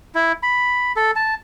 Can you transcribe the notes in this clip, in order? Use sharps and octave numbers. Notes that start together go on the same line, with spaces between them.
E4
B5
A4
A5